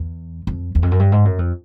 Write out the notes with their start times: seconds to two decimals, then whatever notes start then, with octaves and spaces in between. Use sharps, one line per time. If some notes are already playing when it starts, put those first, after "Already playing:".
Already playing: E2
0.47 F2
0.75 E2
0.83 F2
0.91 F#2
0.99 G2
1.12 G#2
1.25 F#2
1.39 F2